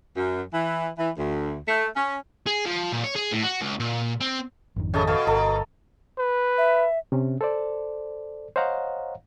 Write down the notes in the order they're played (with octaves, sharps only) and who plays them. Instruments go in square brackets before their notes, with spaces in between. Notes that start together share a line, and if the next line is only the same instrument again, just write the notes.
[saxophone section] F#2
E3
E3
D2
A3
C#4
[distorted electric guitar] G#4
F3
A#2
C#5
G#4
A2
F#4
C#2
A#2
C4
[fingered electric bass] G#1 F2 D#3
[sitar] C#3 [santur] A4 D#5 E5
[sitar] B2 [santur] A4 F5 C#6
[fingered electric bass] G1 [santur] A4 A#4 D#5
[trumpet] B4
[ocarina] E5
[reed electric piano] C3 C#4
A4 C5 D5
C5 C#5 D#5 F5 F#5 A#5